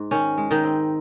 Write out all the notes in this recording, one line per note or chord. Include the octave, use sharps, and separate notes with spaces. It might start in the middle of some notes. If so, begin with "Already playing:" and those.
Already playing: G#2
D#3 C#4
G#3
D#3 D#4
C4